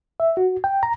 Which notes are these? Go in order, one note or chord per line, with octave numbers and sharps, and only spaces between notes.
E5
F#4
G5
A#5